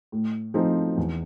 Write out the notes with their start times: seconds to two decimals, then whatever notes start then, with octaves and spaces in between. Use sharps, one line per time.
0.12 A2
0.54 F3 A3 C4 D#4
0.97 E2